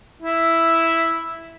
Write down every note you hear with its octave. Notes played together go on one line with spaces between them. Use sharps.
E4